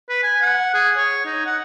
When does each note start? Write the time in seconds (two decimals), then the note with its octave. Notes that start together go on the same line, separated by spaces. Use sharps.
0.09 B4
0.23 G#5
0.42 F#5
0.74 G#4
0.97 C#5
1.26 D#4
1.45 F#5